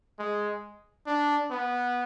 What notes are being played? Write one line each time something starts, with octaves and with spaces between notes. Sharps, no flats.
G#3
D4
B3